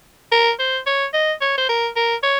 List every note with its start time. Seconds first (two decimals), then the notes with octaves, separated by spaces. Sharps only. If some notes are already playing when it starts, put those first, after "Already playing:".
0.32 A#4
0.59 C5
0.87 C#5
1.14 D#5
1.41 C#5
1.58 C5
1.69 A#4
1.96 A#4
2.23 C#5